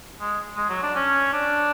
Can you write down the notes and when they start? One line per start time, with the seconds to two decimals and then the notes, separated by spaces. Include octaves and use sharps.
0.21 G#3
0.57 G#3
0.69 F#3
0.83 D4
0.95 C#4
1.33 D4